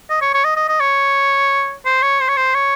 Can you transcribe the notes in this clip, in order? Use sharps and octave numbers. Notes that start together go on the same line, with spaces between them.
D#5
C#5
C#5
D#5
D#5
D#5
C#5
C5
C#5
C5
C#5
C5
C#5